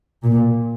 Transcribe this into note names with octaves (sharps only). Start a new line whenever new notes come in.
A#2